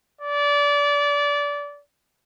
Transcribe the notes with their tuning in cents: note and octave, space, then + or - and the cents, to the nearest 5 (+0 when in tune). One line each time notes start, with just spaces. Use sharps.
D5 -25